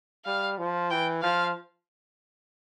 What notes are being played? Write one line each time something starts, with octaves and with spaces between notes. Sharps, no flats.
G3 F5
F3
E3 G5
F3 F5